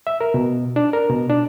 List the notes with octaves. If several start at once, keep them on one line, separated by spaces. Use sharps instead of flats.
E5
A#4
B2
D4
A#4
B2
D4